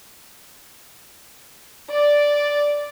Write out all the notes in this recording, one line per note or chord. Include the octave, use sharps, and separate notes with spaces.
D5